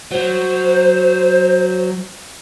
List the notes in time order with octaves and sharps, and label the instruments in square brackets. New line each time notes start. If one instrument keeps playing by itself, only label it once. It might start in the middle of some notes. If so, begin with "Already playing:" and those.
[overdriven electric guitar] F#3 [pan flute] C5